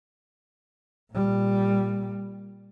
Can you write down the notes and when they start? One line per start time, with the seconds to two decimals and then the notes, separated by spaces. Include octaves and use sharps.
1.13 A#2 G3